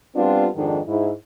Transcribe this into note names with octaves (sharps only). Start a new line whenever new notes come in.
G3 B3 C4 D4 F4
F2 G#2 D#3 D4
G#2 E4